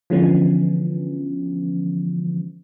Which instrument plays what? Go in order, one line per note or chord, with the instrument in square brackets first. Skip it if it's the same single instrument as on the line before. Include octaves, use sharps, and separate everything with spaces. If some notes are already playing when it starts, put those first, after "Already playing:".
[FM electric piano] D3 E3 F3 G#3 B3 C#4